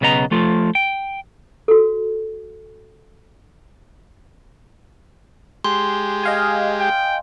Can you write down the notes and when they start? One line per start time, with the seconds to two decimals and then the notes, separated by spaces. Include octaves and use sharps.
0.01 B1 C#3 B3 D#5 A#5
0.31 F3 A3 F4
0.75 G5
1.68 F#4 A4
5.64 G#3 G4 C6
6.23 D#5 F5 G#5
6.80 G5